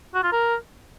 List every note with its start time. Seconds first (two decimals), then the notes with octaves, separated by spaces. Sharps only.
0.14 F#4
0.23 F4
0.32 A#4